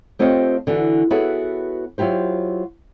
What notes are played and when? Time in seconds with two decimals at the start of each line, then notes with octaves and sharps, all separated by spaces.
0.19 A3 C4 F4 G4 C#5 D#5
0.67 D3 E3 D4 F#4
1.11 B3 E4 F#4 G#4 A4 C#5
1.98 F#3 E4 F4 G4 C5